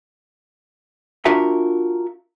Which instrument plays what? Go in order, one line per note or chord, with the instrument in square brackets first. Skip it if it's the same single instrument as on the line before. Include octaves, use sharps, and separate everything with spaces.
[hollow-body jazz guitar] D4 F4 F#4 A#4 E5 G#5